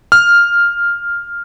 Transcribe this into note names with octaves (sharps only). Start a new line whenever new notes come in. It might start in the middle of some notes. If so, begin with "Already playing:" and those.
F6